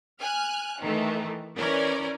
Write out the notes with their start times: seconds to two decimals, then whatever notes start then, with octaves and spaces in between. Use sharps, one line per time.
0.20 G#5 F6 F#6
0.80 D#3 E3 A3
1.57 E3 C#4 A#4 D5